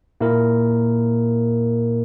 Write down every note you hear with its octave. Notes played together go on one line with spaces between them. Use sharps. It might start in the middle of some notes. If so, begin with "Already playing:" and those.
A#2 A#3 E4 A#4